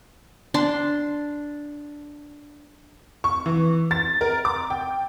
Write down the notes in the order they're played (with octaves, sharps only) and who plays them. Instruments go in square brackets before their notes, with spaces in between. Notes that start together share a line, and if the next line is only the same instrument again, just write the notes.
[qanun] D4 C6
[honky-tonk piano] C#6
E3
A6
A#4
D6
G5